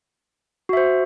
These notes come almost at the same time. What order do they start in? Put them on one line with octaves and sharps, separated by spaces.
F#4 E5 C5